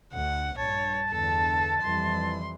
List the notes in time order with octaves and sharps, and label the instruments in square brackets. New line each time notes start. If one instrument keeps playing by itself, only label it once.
[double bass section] D2 [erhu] F#5
[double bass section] A#1 G2 [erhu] C#5 [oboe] A5
[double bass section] E2 D3 [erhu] A4
[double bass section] F2 E3 G3 [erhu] C6